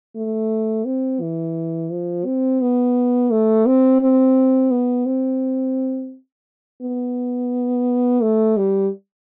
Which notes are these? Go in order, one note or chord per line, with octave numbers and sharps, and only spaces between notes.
A3
C4
E3
F3
C4
B3
A3
C4
C4
B3
C4
B3
A3
G3